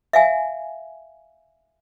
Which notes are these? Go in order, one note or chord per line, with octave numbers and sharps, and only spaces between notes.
E5 F5 G#5